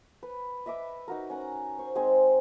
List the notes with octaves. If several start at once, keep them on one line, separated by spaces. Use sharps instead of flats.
B4
D#5 E5 B5 D6
D#4 F#4 A#4
C#4 F#5 A#5
C5 C#6
G#3 C4 D#4 G#4